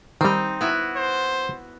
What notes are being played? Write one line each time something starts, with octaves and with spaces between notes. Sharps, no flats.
D#3 G3 C4 D#4
B3 E4 F#4
C5